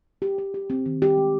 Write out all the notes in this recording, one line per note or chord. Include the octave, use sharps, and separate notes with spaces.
G4
G4
G4
C4
D#3
G4
G#3